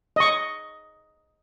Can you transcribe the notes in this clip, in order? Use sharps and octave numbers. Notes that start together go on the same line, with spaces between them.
D#5 C#6